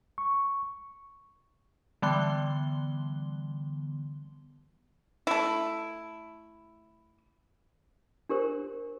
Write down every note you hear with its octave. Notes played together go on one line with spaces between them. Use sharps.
C#6
D3 E3 G3 B3 C6 G7
A3 E4
D4 G4 A#4 C5